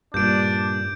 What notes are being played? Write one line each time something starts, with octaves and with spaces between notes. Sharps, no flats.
G2 A#2 D4 G6 D7